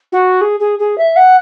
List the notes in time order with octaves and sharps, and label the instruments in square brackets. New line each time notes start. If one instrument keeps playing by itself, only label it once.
[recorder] F#4
G#4
G#4
G#4
E5
F#5